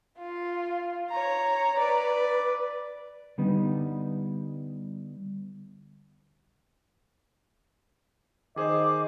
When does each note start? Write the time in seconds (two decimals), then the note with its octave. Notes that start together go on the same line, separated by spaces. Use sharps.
0.19 F4
1.10 C#5 A#5
1.78 B4 D5
3.38 D3 G3 B3 D#4
8.56 D#3 G#4 C5 D#5 D6